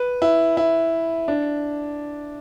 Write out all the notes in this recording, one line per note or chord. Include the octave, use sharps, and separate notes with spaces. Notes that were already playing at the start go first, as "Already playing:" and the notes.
Already playing: B4
E4
E4
D4